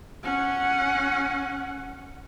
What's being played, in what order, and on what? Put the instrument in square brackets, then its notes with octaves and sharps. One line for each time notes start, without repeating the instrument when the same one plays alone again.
[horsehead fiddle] C#4 F#5